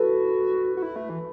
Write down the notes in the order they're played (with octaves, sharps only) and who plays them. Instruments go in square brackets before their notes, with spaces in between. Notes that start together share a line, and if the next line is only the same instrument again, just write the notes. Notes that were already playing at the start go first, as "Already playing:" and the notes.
Already playing: [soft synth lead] F#4 [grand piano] A4 B4
[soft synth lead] F#4
E4
A3
E3